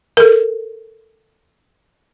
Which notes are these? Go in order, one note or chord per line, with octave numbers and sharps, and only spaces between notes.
A4 A#4